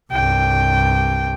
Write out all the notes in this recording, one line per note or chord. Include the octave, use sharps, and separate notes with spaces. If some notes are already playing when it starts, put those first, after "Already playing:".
C2 G2 G5